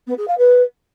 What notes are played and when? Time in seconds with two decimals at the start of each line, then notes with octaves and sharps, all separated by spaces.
0.07 B3
0.17 G#4
0.28 F5
0.38 B4